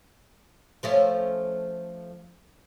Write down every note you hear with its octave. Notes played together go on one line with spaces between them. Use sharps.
F3 A3 C#4